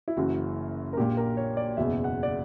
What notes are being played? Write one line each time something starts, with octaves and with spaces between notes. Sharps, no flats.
E4
F#1 F#2 E3 F#4
A#4
A#1 A#2 G4
A#4
C#5
D5
F#1 E2 B2 E5
F#5
D5